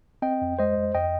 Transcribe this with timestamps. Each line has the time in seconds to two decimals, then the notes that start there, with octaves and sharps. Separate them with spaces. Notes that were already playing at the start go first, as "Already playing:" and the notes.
0.22 C4 D#5 G5
0.41 F2
0.59 G#3 C5 D#5
0.77 F2
0.95 F2 D#5 G5